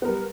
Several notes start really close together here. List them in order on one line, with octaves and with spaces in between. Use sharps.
B3 A#4 G3